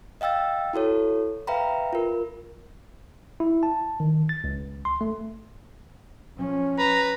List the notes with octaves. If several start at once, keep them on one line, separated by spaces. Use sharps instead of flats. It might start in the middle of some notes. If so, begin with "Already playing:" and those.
D#5 F5 G5 E6 A6
E4 F#4 A4 C#5
B4 E5 F5 G5 A#5 B5
F4 A#4
E4
A5
D#3
A6
C#2
C6
A3
F3 C#4
B4 A#5